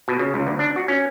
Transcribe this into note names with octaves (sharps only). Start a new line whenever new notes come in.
B2
C#3
C#2
D2
D4
F#4
C#4